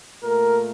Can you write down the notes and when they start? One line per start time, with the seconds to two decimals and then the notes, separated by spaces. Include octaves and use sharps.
0.22 A#2 A3 A#4